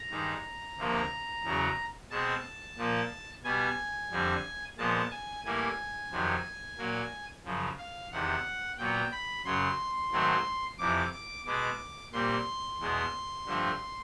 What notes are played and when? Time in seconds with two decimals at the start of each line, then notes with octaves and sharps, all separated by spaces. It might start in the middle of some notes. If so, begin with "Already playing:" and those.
Already playing: A#5
0.10 G2 D#3 G#3
0.78 D2 C3 F3 A#3
1.44 E2 C#3 F#3
2.10 B2 G#3 C4 A5
2.77 A#2 F3 A#3
3.43 B2 G3 B3 G#5
4.11 F2 D3 G3 C4
4.78 A#2 F3 G#3 B3 A5
5.10 G#5
5.45 A2 E3 G3 A#3 G#5
6.11 F2 C3 D#3 F#3
6.78 A#2 F#3 A#3
7.45 F#2 C#3 F3
7.78 F5
8.11 E2 C3 D#3 F#5
8.78 A#2 F#3 B3 G5
9.12 B5
9.45 F#2 C#3 F#3 C6
10.12 G#2 D#3 F#3 A3 C4
10.78 F2 C3 E3 D6
11.12 D6
11.45 B2 G#3 B3 D6
12.13 A#2 G3 C4 C6
12.80 E2 B2 G#3 B3
13.46 G2 D3 F3 A3 C4